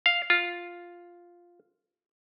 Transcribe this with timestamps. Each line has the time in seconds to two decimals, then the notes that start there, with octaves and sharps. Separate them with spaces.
0.06 F5
0.30 F4